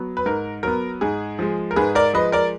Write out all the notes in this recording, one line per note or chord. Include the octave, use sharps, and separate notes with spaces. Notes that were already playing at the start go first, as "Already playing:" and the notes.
Already playing: F#3 B3
B4
G#2 A#4
F#3 B3 A#4
G#2 G#4
F3 G#3
A#4
G#2 G#4 B4
A#4 D5
F3 G#3 B4 D#5
A#4 D5